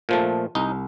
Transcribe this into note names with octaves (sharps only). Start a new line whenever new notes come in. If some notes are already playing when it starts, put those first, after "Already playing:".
A#2 F3 A3
C2 D#4